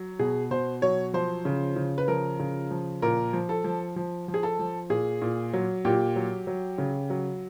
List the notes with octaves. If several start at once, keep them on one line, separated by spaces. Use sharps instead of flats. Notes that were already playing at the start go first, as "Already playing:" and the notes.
Already playing: F#3
B2 G#4
B2 C5
F#3 C#5
F3 C5
C#3
C#3
B4
F3 A#4
C#3
F3
A#2 A#4
F3
A4
F3
F3
F3
G#4
A4
F3
A#2 G#4
A#2
F#3
A#2 G4
F#3
F#3
C#3
F#3